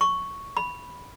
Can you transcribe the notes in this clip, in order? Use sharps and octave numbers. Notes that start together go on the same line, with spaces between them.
C#6
B5